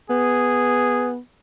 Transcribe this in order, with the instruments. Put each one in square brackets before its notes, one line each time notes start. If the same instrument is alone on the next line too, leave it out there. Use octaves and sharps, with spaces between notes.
[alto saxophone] B3 [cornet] G#4